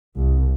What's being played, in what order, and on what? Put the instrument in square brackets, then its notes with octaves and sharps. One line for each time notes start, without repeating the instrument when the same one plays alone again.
[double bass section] C2